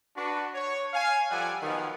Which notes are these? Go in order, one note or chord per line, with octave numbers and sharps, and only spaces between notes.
D4 F#4 B4
C#5
F5 G#5
F3 G3 A4 D5 F#5 G#5
D#3 F3 F#3 B3 F4